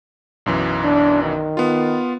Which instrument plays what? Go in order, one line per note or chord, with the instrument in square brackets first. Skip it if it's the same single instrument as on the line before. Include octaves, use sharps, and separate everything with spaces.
[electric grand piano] B1 F#2 E3
[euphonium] D4
D#3
[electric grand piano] B3 F4